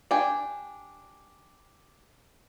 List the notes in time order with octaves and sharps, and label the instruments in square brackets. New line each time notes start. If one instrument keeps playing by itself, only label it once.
[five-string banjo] D4 G4 G5 G#5